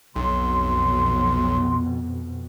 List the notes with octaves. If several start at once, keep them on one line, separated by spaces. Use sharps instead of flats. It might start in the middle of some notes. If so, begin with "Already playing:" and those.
B1 F2 B2 C6